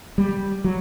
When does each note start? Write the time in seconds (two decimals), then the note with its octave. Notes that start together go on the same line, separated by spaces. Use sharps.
0.18 G3
0.64 F#3